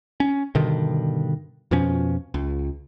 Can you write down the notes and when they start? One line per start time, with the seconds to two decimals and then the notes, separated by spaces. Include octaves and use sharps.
0.20 C#4
0.55 G2 B2 D3 D#3
1.71 F2 B2 F3 C#4
2.34 C#2